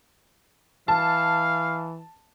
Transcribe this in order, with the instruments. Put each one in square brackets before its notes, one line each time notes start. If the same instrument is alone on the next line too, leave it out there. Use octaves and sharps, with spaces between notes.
[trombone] E3 [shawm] F5 [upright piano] A5